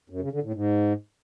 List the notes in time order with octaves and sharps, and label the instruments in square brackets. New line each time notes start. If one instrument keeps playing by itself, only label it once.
[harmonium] F#2
C#3
D3
A2
G#2